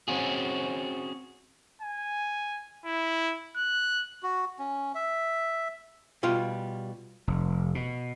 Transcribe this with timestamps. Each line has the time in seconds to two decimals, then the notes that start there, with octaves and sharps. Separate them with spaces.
0.08 C4 C#4 F#4 G#4
1.81 G#5
2.85 E4
3.56 F#6
4.23 F#4
4.59 C#4
4.95 E5
6.23 B2 G3 F4 G5
7.27 F1
7.75 B2